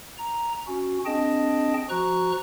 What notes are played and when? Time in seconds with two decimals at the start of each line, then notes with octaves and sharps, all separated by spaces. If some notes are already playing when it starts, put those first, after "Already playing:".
0.18 A#5
0.67 C#4 F#4
1.05 C4 D4 G#4 D#5 G5 A5
1.89 F3 F#4 A#5 C#6 F#6